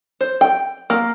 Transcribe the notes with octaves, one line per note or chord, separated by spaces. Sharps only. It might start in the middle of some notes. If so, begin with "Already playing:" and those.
C5
G5
A#3